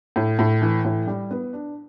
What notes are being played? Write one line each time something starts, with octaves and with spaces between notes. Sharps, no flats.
A2
A2
E3
A2
G3
B3
D4